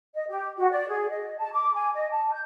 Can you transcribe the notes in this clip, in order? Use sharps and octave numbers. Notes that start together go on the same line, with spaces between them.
D#5
G4
F#4
D5
G#4
D#5
A5
D6
G#5
D#5
A5
G6